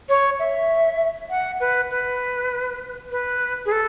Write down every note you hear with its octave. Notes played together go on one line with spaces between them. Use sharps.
C#5
E5
F#5
B4
B4
B4
G#4
A4